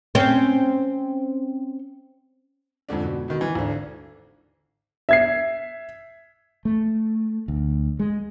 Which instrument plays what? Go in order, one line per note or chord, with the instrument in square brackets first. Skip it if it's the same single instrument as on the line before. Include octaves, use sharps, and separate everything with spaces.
[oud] C4 C#4
[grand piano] F2 G#2 D3 D4
B2
B2 D#3
E3
G#1 D3
E5 G#6 C7
[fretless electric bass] A3
D2
G#3